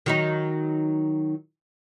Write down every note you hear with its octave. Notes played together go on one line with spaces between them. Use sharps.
D#3 F#3 D#4